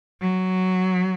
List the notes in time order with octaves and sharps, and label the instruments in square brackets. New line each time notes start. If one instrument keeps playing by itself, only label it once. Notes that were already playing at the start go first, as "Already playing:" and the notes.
[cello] F#3